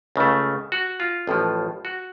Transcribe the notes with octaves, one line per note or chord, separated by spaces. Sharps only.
C#2 C#3 A3
F#4
F4
A1 A2 F3
F#4